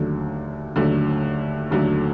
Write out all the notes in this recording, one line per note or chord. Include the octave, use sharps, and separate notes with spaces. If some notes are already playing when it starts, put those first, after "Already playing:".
Already playing: D#2 D3 F#3 A3
D#2 D3 F#3 A3
D#2 D3 F#3 A3